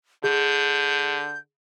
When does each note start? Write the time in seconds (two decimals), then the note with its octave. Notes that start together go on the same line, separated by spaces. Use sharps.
0.24 D3 G#4 G6